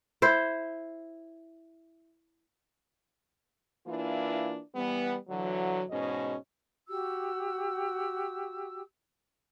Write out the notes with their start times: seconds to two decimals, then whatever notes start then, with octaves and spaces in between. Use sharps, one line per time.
0.22 E4 C5
3.87 E3 A#3 D4 E4 F4
4.75 E3 G3 B3
5.29 D3 E3 F#3
5.90 E2 G#2 B2 C#4 D#5
6.88 F#4 G4 E6